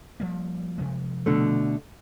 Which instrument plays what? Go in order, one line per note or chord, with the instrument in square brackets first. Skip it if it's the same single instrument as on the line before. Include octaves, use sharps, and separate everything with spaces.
[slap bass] F3 G3 A#3
C3 F3 G#3
[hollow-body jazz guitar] B2 D3 A3